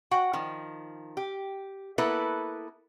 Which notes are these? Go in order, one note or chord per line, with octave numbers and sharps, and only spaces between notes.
F#4 F#5 G5
D#3 F3
G4
A#3 B3 E4 A4 B4